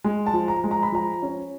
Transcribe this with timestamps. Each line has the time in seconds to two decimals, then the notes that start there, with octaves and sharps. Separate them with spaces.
0.04 G#3
0.26 A5
0.33 F3
0.48 A#5
0.64 G#3
0.71 A#5
0.83 B5
0.92 F3 A#5
1.22 C#4